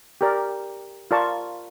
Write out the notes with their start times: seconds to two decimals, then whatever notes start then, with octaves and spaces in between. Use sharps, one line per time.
0.21 G4 A#4 D5
1.11 F4 A#4 D5 A5 C#6